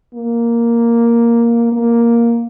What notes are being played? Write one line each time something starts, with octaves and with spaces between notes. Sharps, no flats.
A#3
A#3